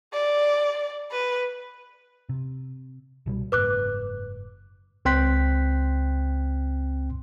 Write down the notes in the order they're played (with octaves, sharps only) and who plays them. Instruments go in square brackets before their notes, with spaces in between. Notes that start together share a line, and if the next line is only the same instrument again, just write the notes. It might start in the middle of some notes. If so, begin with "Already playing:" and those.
[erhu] D5
B4
[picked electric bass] C3
C2 B2 G3
[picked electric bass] F#1 G#2 [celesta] B4 D6 F#6
[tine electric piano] C#2 C4 G5 C6 F#6 B6